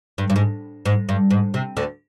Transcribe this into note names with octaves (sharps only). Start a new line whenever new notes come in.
G2
G2
G#2
G#2
G2
G#2
C3
D2 D3